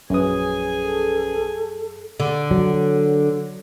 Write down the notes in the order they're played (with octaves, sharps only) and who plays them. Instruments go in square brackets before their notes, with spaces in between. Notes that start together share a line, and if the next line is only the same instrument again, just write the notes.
[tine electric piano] A#1 C#4 B4 [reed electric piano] F#2 D#6 [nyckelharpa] G#4 G#5
[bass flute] A4
[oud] D3
[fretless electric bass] F#3